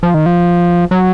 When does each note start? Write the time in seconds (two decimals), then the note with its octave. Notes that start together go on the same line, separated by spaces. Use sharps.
0.03 F3
0.14 D#3
0.26 F3
0.91 F#3